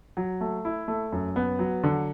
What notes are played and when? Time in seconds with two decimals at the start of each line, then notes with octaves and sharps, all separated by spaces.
0.17 F#3
0.41 A3
0.65 E4
0.88 A3
1.12 F#2
1.36 B3
1.59 F#3
1.84 D3